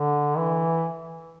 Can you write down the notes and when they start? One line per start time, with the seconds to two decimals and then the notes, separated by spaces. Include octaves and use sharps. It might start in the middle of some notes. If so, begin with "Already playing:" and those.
Already playing: D3
0.37 E3